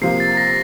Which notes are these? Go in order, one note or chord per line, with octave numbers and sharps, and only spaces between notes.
C3 F3 A#3 C7
A6
A#6